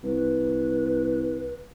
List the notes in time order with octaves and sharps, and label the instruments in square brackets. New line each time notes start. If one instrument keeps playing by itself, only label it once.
[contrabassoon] C2 [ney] B4